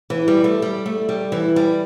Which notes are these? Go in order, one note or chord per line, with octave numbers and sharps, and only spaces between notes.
E3
G3
A3
G3
A3
G3
E3
G3